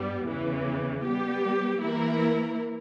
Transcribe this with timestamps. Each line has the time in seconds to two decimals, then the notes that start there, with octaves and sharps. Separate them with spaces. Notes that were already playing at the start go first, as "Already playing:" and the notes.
Already playing: G2 G3 B3
0.27 E2 C#3 E3
1.04 G3 B3 G4
1.81 E3 A#3 E4 A#4